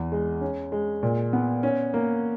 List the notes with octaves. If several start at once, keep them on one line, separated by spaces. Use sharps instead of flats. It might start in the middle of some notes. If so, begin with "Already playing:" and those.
Already playing: E2
G#3
C#4
G#3
A#2
B3
C#4
A#3